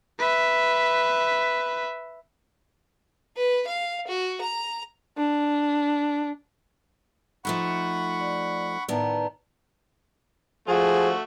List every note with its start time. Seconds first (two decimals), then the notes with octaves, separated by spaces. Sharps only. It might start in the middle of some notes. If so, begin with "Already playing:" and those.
0.19 B4 E5
3.37 B4
3.67 F5
4.08 F#4
4.41 A#5
5.18 D4
7.45 F3 A3 D#4 F#5 B5 C#6
8.21 D5
8.88 A2 D#3 B3 D5 A5 A#5
10.68 F3 A3 F#4 G#4